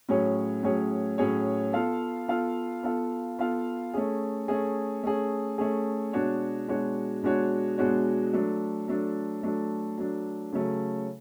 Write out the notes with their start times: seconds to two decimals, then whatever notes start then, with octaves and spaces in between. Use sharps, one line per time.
0.08 A2 F#3 C#4 G#4 C#5
0.63 A2 F#3 C#4 G#4 C#5
1.18 A2 F#3 C#4 G#4 C#5
1.73 B3 F4 A4 F5
2.28 B3 F4 A4 F5
2.83 B3 F4 A4 F5
3.39 B3 F4 A4 F5
3.94 A3 C#4 G#4
4.48 A3 C#4 G#4
5.03 A3 C#4 G#4
5.58 A3 C#4 G#4
6.13 B2 G#3 D4 F#4 C#5
6.68 B2 G#3 D4 F#4 C#5
7.23 B2 G#3 D4 F#4 C#5
7.78 B2 G#3 D4 F#4 C#5
8.33 F#3 A3 D4
8.88 F#3 A3 D4
9.43 F#3 A3 D4
9.98 F#3 A3 D4
10.53 C#3 F#3 A3